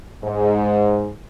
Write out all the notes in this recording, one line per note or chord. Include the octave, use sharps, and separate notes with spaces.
G#2